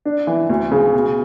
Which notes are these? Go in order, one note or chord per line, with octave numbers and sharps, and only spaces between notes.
D4
E3
D2
C#3
B2